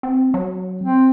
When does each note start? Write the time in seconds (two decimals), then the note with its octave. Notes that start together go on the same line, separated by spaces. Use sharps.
0.03 C4
0.34 F#3
0.81 C4